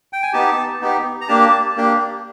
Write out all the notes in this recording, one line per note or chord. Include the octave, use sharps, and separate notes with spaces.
G5
G#5
B3 D#4 G4 A5
B3 D#4 G4
A#5
A#3 D4 G4 A5
A#3 D4 G4